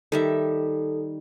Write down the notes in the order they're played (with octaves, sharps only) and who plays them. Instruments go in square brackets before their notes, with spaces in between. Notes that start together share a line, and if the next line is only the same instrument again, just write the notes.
[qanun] D#3 G3 E5 [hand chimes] A4